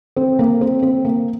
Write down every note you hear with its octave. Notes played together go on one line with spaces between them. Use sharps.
C4
A#3
C4
C4
A#3